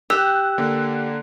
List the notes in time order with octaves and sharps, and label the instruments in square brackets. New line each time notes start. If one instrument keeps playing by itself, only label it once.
[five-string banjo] G4 [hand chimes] E6 [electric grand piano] F#6
[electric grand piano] D3 A#3